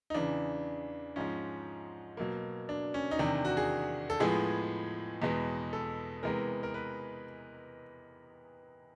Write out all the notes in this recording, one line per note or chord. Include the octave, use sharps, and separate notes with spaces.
D#4
E2 C#3 E3 D4
G#2 F3 G#3 C#4
B2 F#3 A#3
D4
C#4
D#4
E2 C3 D#3 D4
F#4
G#4
A4
A2 F3 G#3 B3 G#4
E2 B2 G#3 B3
A4
C3 E3 G#3 B3 A#4
A#4
B4